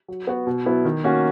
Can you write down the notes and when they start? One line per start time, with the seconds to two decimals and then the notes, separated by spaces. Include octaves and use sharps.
0.08 F#3
0.27 B3 F#4
0.47 B2
0.66 F#3 B3 E4
0.85 D#3
1.04 A#3 C#4 F#4